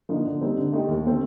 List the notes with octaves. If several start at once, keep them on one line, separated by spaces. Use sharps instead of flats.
D3 F3 A#3 D#4
D3
G3 C4 D#4
D3
A3 D#4 G4
D#2
D3 A3 C4